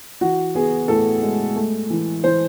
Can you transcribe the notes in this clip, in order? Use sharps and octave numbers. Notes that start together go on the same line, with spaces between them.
E3 F#4
B3 G#4
A2 A4
G#3
A3
E3
E3 C5